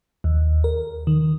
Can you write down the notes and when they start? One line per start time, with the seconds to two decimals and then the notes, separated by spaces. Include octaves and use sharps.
0.24 D#2
0.64 A#4
1.07 D#3